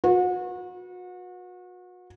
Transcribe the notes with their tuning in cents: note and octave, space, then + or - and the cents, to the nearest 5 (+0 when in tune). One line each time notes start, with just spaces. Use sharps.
F#4 -35 B4 -30